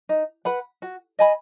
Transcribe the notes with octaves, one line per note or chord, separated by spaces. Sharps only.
D#4
B4 F#5 B5
F#4
D#5 G#5 B5